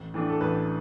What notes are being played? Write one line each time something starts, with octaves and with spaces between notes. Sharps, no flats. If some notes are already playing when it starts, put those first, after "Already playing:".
Already playing: A1
A2 E3 A3 D4
A4
A1 B4